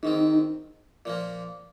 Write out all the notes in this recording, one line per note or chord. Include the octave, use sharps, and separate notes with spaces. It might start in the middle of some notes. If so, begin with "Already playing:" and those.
G#2 D#3 C4 D#4
A#2 F3 A#3